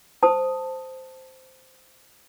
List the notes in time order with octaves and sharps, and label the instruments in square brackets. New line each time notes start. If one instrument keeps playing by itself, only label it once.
[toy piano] C5 A5 D#6